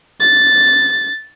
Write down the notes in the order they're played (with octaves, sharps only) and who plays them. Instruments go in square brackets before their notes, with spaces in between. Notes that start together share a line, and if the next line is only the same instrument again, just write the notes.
[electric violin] A6